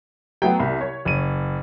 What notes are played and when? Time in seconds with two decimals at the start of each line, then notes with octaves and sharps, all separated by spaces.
0.42 F#3 A3 B3 G5
0.60 C2 B5
0.81 C#5
1.05 F#1 D#7